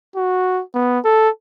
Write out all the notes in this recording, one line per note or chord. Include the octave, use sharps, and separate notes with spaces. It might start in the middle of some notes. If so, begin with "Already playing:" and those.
F#4
B3
A4